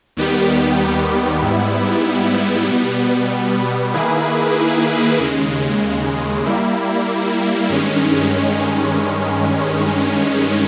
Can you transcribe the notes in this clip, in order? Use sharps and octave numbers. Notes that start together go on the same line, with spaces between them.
D#2 D#3 G3 B3 G4
G#2 G3 B3 E4
B2 G3 B3
D#3 A#3 E4 G#4 B4
D#2 C#3 G#3
G3 A#3 E4
G2 D#3 G#3 C#4